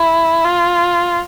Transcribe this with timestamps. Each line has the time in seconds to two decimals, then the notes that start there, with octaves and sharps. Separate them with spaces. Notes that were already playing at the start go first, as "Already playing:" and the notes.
Already playing: E4
0.44 F4